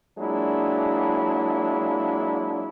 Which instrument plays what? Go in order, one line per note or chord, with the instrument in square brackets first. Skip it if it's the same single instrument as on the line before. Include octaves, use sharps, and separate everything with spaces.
[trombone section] F#3 G#3 A#3 D4 E4 F4